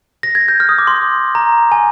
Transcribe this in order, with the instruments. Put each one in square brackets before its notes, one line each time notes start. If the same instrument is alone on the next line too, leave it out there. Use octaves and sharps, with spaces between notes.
[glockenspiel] A#6
G#6
G6
F6
D#6
D6
C6
A#5
G#5